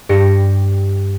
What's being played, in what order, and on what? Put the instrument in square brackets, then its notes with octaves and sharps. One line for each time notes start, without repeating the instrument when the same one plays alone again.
[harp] G2 G4 A#6 C#7